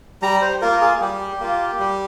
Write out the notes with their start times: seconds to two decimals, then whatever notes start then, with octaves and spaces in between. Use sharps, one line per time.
0.22 G3 A#5
0.42 C5
0.61 A#3 F4 A#4
0.81 G#4
1.01 G3 G4
1.40 A#3 F4
1.79 G3